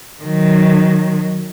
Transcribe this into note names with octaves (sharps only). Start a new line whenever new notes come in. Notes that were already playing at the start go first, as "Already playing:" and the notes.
D#3 F#3